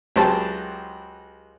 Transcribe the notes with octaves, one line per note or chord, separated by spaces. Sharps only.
C#2 F#3 G4 C5 A5